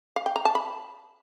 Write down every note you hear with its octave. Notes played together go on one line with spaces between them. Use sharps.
F5
G5
A#5
A5
B5